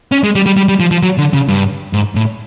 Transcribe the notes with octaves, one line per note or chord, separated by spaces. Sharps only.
C#4
G#3
G3
G3
G3
G3
F3
F3
F#3
D3
C#3
G2
G#2
A2